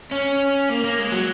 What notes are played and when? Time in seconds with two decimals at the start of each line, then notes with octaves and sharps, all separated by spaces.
0.11 C#4
0.69 A#3
0.84 A#3
0.99 G#3
1.12 F#3